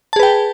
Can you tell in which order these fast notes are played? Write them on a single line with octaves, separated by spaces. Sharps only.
A5 G#4 B4 G5